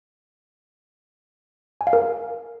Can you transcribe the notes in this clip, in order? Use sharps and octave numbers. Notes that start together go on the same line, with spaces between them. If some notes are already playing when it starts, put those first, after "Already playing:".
G#5
F5
A#4